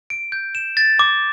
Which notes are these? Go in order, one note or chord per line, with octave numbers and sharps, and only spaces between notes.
D7
G6
E7
A6
D6